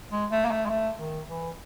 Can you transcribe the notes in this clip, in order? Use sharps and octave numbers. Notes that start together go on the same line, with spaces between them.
G#3
A3
A#3
A3
G#3
A3
D#3
E3